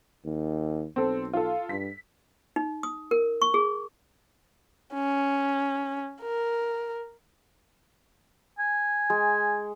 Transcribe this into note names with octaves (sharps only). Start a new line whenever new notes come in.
D#2
B1 C4 A4
F4 A4
G2 B6
D#4
D#6
A#4
C#6
G#4
C#4
A#4
G#5
G#3